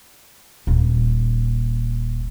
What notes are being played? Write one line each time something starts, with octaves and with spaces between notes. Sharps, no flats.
D#1 A#2